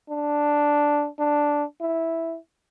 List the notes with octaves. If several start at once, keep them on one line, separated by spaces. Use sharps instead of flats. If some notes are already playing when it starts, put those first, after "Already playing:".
D4
D4
E4